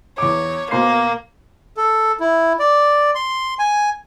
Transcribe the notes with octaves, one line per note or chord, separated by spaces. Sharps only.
E2 C#5 D6
B2 A#3 C5 C7
A4
E4
D5
C6
G#5